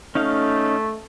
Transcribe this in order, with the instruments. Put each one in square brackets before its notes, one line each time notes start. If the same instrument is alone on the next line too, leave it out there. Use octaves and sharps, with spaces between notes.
[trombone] A3 [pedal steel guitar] C#4 D#4 F5